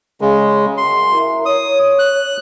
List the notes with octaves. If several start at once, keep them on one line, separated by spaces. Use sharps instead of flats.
C#3 G#3
F#2 C6
E4 A#4
C#5 D#6
F#6